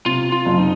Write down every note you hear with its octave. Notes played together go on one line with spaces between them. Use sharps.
C3 F4
F4
F#1
D#4